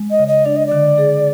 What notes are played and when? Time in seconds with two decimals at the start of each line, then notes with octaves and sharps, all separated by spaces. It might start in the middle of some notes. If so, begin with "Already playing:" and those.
Already playing: G#3
0.11 D#5
0.19 C#3
0.28 D#5
0.45 D4 D5
0.56 D#5
0.66 D5
0.72 D3
0.98 G#4